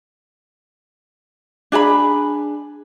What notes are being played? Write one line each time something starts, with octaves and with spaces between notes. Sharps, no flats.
D4 G#4 D#5 B5